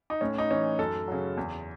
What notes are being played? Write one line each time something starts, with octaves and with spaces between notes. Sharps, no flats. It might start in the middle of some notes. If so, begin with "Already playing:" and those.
D#4
A2 C#4
D#4
E3 C#4
F#2 A4
C#3 F#3
E2